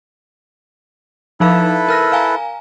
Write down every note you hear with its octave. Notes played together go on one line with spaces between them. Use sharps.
F3 D#4 E4 A4 B4 F5
A#4 F6 A#6
F5 G#5 A#5